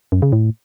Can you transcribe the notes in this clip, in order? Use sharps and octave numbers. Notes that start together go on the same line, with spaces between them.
F#2
C#3
A2